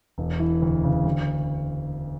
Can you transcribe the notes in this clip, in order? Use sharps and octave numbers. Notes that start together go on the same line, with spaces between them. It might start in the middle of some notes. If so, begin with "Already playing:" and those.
E1
E3
D2
C#3
D2